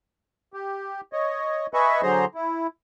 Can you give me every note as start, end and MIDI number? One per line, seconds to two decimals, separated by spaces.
0.54 1.01 67
1.13 1.67 73
1.13 1.67 75
1.74 2.01 71
1.74 2.01 75
1.74 2.01 76
1.74 2.01 80
1.74 2.01 83
1.74 2.01 85
2.03 2.25 50
2.03 2.25 54
2.03 2.25 68
2.03 2.25 72
2.03 2.25 82
2.03 2.25 84
2.35 2.67 64